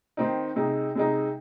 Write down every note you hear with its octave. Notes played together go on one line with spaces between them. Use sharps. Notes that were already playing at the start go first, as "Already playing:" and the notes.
D#3 C4 D#4
C3 G#3 D#4
C3 G#3 D#4